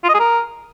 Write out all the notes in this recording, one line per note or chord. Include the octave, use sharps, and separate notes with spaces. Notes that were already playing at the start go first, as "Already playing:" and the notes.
F4
D#5
G#4
A#4